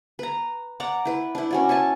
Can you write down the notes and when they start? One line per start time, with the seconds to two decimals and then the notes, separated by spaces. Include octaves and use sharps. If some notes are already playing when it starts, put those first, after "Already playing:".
0.19 B4 A#5
0.80 D5 F#5 A#5 D6
1.05 E4 B4
1.35 D4 E4
1.51 C#4 F#4 D5
1.69 C#5 E5 G#5 A5